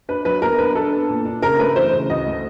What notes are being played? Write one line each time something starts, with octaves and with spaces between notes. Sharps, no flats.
D4 B4
F#3 B4
B3 A#4
D4 B4
D4 A4
B3
A#2
D4
C#3 A#4
A3 B4
E3 C5
C#3
D2 D#5
A3